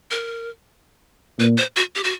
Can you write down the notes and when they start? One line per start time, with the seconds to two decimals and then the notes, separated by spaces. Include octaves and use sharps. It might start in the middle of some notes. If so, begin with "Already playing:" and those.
0.11 A#4
1.39 A#2 B4
1.57 C5
1.76 F#4
1.95 G4
2.04 F#4